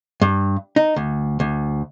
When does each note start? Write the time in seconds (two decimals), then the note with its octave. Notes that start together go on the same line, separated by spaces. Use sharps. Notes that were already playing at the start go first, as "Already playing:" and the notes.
0.22 G2
0.76 D#4
0.96 D2
1.40 D2